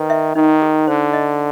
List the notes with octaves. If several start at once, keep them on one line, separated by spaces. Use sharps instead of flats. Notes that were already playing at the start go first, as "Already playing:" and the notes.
Already playing: D#3 B4
E5
D#3 D#4
G#4
D3 C5
D#5